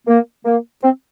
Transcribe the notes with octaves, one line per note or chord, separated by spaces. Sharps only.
A#3
A#3
C4